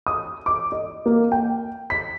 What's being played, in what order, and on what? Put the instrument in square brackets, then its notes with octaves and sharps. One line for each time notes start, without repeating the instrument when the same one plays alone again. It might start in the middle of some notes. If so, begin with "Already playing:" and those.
[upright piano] D#6
D6
D#5
A#3
G5
B6